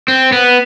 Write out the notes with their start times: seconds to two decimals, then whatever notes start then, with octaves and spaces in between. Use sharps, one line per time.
0.08 C4
0.32 B3